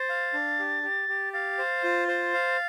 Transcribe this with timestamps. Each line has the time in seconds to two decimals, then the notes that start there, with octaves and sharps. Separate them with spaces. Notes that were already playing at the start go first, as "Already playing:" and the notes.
Already playing: C5 A6
0.09 F5
0.34 D4
0.59 G4
0.83 G4
1.09 G4
1.33 F5 A6
1.58 C5
1.84 F4
2.08 C5
2.34 F5